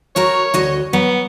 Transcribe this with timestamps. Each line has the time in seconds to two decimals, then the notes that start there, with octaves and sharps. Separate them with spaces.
0.16 F#4 A#4 C#5 A#5
0.54 D2 F#4 D#5
0.93 F#3 B3